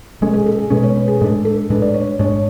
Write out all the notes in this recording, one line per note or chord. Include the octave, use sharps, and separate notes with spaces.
B2 G#3 C#4 A4
G#4
A4
G#4
B2 G#3 C#4 B4
C#5
B4
G#4
A2 G#3 D4 A4
A4
A2 G#3 D4 B4
D5
C#5
G#2 G#3 D4 C#5